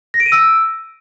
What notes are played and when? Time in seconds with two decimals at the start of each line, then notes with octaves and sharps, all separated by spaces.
0.14 A#6
0.20 D7
0.26 D#7
0.32 E6